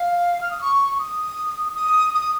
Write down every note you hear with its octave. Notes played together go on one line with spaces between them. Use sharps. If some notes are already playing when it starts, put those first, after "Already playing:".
Already playing: F5
F6
D#6
C#6
D#6
D#6
D#6